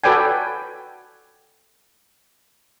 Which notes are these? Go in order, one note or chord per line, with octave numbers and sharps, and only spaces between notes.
F#4 A4 B4 D5 G5 G#5